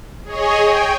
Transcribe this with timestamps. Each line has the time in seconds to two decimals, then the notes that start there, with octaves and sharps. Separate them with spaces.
0.24 G#4 C#5 D#5
0.63 G5 G#5